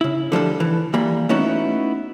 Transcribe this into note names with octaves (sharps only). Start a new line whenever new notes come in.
C#3 E4
D3 F3 G3 A4
E3
E3 G3 A#3 B5
A3 B3 C#4 D#4 E4 F#4